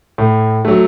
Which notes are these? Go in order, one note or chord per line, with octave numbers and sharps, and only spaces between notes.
A2
F#3 A3